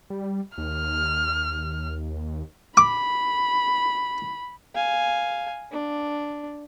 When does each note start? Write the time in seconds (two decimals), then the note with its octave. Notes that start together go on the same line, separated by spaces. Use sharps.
0.10 G3
0.58 D#2 F6
2.77 B5 D6
4.75 F5 G#5
5.72 D4